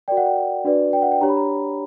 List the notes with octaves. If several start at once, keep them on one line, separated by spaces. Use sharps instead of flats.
F#4 A#4 D5 G5
F#5
G5
F#5
D4 F#4 B4 D5
G5
F#5
G5
D4 G4 C#5 A#5
B5
A#5